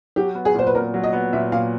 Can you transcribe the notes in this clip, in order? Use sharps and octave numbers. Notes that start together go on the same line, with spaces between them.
F#3 G4
B3
G#4
A#2 C5
B4
A#2 A#4
F#3
D#5
B3
A#2 E5
A#2 F5